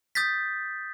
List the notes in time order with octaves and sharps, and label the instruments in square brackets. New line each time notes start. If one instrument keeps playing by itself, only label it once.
[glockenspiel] D#6 G6 A6 B6